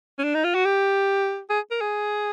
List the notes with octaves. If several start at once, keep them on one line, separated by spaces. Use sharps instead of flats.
C#4
D4
D#4
F4
F#4
G4
G#4
A#4
G#4